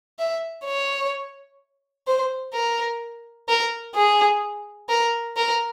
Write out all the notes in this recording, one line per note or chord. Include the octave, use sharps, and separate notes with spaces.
E5
C#5
C5
A#4
A#4
G#4
A#4
A#4